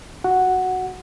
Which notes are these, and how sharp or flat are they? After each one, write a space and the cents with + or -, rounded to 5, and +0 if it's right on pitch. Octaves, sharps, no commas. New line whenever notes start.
F#4 +0 F#5 +0